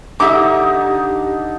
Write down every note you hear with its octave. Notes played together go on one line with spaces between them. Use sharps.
D3 D#4 G4 E5 D6